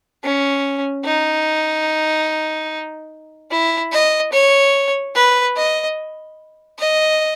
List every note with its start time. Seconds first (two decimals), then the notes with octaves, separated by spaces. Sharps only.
0.23 C#4
1.05 D#4
3.50 E4
3.92 D#5
4.32 C#5
5.15 B4
5.56 D#5
6.79 D#5